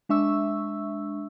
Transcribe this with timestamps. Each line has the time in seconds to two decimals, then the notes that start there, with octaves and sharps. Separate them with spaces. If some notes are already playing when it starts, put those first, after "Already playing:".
0.09 G#3 D4 E5 C#6 E6